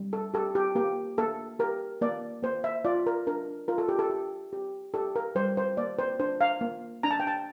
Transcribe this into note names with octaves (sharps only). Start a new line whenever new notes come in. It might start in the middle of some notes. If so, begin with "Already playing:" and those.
Already playing: G3
A4
G4 A4
G4
A#3 G4
A#3 A4
G4 A#4
A#3 D5
A#3 C5
E5
F4 D5
A#4
D4 A#4
F4 A#4
A4
G4
A4
G4
G4
G4 A4
A#4
G3 C5
C5
A#3 D5
C5
D4 C5
F5
A#3
D4 A#5
A5
G5
A5